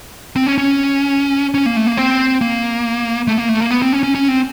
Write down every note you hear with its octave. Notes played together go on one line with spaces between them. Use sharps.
C4
C#4
C#4
C#4
A#3
A3
A#3
C4
A#3
A3
A#3
A3
A#3
B3
C4
C#4
C#4
C#4
C4